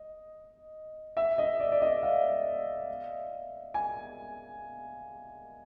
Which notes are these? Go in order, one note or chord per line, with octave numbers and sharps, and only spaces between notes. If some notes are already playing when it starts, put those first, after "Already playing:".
Already playing: D#5
E5
D#5
D5
D5
D#5
F5
G#5